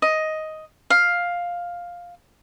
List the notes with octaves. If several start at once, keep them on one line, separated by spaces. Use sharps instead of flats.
D#5
F5